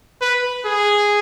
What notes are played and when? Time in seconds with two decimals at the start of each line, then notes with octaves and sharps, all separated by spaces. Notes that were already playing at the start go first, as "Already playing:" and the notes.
0.21 B4
0.65 G#4